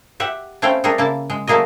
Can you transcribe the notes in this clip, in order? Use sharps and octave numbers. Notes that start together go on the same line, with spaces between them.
G4 E5 F#5
A3 C4 C#4 E4 F5 G5
G3 A3 G#4 A#4
C#3 A#3 E4 A5
G#3
F#3 A3 A#3 G#4 A#4 D#5